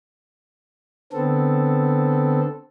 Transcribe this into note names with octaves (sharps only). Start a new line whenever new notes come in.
D3 B3 C4 A4